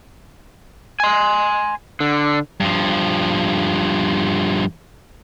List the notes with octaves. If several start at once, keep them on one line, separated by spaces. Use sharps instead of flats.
G#5 C6
D3
G2 F3